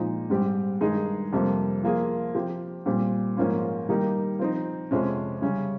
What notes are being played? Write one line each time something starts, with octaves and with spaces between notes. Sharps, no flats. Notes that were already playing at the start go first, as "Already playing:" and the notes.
Already playing: A#2 F3 G#3 D#4
G#2 G3 C4 G4
G2 D#3 G#3 D#4 G#4
F2 C3 G3 A#3
F3 A#3 F4 G#4
F3 C4 G4
A#2 G3 C4
G#2 F3 A#3 C#4 F4
D#3 G3 A#3 D#4 G4
F3 C4 D#4
F2 C3 F3 G#3 C#4
C#3 G3 C#4